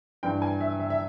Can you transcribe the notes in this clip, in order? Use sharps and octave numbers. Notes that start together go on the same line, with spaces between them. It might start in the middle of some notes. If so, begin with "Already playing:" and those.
G2 E3 G5
G#5
E5
E5
E5